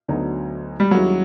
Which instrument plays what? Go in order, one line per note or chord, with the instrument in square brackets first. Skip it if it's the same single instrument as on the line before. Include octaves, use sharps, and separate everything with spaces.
[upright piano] D2 D3 F#3 B3 D#4
[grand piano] G3
[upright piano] D#2 D#3 G#3 C#4 E4 [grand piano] F#3